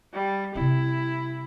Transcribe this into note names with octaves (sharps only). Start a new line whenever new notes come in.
G3
C3 C4 E4